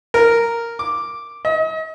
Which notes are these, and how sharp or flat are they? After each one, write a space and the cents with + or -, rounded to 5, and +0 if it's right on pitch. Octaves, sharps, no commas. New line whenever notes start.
A#4 -5
D6 +0
D#5 +40